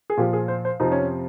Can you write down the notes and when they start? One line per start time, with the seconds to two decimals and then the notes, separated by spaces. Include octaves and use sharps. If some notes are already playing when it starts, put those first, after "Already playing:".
0.10 G#4
0.17 A#2 F3 G4
0.33 G#4
0.48 C5
0.65 C5
0.80 F2 C3 F3 D#4
0.92 C#4